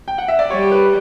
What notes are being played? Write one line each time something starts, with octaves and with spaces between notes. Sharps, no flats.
G5
F#5
E5
D5
G3 C#5
B4